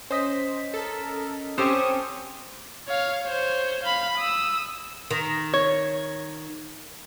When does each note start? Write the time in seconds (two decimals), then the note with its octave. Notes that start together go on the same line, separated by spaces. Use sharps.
0.11 C#4 C5 D#5 B6
0.74 A4 A#4
1.58 C4 C#4 G4 A4 C5 C#6 D#6
2.88 C#5 F5
3.24 C5 C#5
3.83 F5 B5
4.18 D#6 E6
5.11 D#3
5.54 C#5